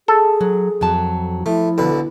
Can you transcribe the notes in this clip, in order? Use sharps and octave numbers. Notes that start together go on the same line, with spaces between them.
G#4 A4
F#3
F2 F#3 A5
F3 A3 E4
B1 D3 B4